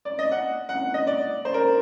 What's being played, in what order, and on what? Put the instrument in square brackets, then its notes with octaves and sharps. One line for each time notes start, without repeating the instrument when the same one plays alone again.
[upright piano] D5
D#5
F#5
F#5
D#5
D5
C5
A#4